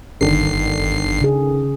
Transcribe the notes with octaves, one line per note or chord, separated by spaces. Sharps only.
G1 D3 D#3 C7
C#3 G#4